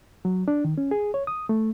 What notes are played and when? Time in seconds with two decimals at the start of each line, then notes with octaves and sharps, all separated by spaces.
0.25 F#3
0.48 D4
0.64 D#3
0.78 C#4
0.91 G#4
1.14 C#5
1.27 D#6
1.49 A3